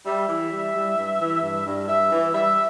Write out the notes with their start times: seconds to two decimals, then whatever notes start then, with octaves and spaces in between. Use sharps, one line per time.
0.06 G3 E5
0.28 E3
0.52 G3
0.74 G3
0.97 G2
1.20 E3
1.43 G2
1.66 G2
1.88 G2 E5
2.11 E3
2.34 G3 E5